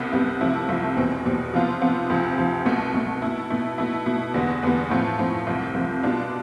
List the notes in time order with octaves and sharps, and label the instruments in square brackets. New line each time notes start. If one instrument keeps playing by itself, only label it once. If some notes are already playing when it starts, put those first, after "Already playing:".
Already playing: [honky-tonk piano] C2 C3 G3 B3
C2 C3 G3 B3
C2 C3 F3 A3 E4
C2 C3 F3 A3 E4
E2 B2 G3 C4
E2 B2 G3 C4
C3 F3 B3 F4
C3 F3 B3 F4
D2 C3 F3
D2 C3 F3
C2 B2 A3
C2 B2 A3
B2 A3 E4
B2 A3 E4
B2 A3 E4
B2 A3 E4
E2 D3 G3 B3
E2 D3 G3 B3
A2 F3 A3 C4
A2 F3 A3 C4
C2 C3 F3
C2 C3 F3
B2 G3 D4 F4